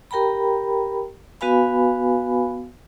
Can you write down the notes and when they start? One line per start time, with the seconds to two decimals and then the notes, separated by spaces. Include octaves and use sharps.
0.11 G4 A#4 G5 A#5 B5
1.41 B3 F#4 B4 F5 G#5 B5